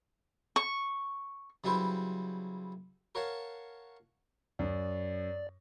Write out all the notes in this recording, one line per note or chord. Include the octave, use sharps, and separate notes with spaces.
C#6
C#3 F#3 G3 E4 B4 C5
A#4 C#5 F5 F#5 A5
F#2 D5